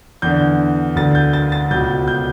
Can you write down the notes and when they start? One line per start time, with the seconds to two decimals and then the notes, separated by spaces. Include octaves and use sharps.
0.22 E2 D3 G6
0.96 D2 D3 A6
1.15 G6
1.33 A6
1.52 A6
1.70 C#2 B2 G6
2.08 G6